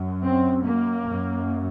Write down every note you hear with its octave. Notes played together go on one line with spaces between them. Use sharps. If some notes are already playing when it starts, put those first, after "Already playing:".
Already playing: F#2
C4
A#3
F#2